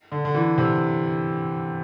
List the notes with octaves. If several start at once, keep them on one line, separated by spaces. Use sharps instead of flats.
D3
D3
E3
C3